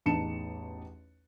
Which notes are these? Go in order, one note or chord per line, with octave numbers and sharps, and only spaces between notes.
A1 E2 D#4 A5 C#7 E7